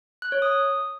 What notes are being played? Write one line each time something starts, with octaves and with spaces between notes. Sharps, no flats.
F#6
C#5
D#6